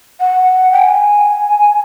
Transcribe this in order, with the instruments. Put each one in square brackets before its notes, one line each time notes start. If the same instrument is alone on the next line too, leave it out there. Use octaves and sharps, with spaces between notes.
[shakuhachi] F#5
G5
G#5